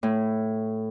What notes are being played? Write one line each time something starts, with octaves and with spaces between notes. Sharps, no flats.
A2